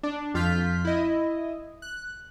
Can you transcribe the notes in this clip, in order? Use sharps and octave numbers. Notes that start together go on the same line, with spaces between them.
D4
F2 F4 F6 G6 B6
E4 D#5
F#6